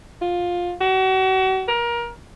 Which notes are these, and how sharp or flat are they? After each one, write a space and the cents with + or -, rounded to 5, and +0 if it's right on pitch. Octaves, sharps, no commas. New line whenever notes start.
F4 +15
F#4 +35
A#4 +25